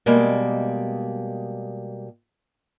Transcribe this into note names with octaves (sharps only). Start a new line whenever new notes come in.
B2 G3 G#3 A#3